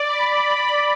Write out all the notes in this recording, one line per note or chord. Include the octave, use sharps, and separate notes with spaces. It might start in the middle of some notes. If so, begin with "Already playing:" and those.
Already playing: D5
B5